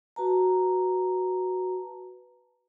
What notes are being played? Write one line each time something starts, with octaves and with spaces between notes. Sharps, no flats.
F#4 B4 A5 A#5